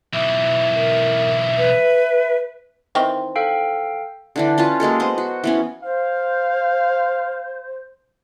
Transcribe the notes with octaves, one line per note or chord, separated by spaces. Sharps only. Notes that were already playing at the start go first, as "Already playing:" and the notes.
B1 E3 E5
A#4
B4
D#3 E3 C4
A4 F5 G5
D3 E3 D4
C#4 F4 B4 A5
F#3 G#3 A#3 A4
B3 C5 D#5
F#4
E3 B3 C#4
C5 F5